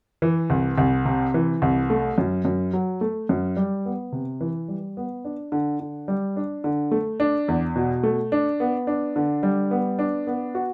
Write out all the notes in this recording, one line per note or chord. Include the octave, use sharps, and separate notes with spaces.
E3
C2
C2
C3
E3
C2
A3
F#2
F#2
F#3
A3
F#2
G3
B3
C3
E3
G3
B3
D4
D3
D3
G3
D4
D3
A3
D4
E2
B2
A3
D4
B3
D4
D3
G3
B3
D4
B3
F#4